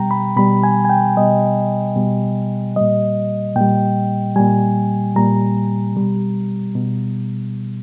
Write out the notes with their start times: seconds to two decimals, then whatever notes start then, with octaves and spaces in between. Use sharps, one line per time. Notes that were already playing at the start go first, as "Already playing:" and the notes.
Already playing: B2 G3 G5 A#5
0.11 B5
0.37 B2 G3 B5
0.63 G#5
0.85 G#5
0.89 G5
1.17 B2 G3 D#5
1.96 B2 G3
2.76 A#2 G3 D#5
3.56 A#2 G3 G5
4.36 A#2 G3 G#5
5.16 A#2 G3 A#5
5.96 B2 G3
6.75 B2